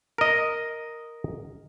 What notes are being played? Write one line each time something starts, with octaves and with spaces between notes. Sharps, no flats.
A#4 D#5